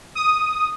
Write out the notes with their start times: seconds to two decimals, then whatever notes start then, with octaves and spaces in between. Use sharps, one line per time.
0.15 D#6